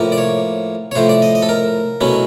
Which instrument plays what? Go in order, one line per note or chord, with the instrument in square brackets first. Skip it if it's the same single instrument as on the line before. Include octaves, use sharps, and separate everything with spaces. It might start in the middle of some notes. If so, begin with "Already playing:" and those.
Already playing: [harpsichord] A2 F3 A#3
D5
C#5
C#5
A2 F3 A3 C5
D5
D#5
D#5
A4
A#4
B2 F#3 A3 C#4 E4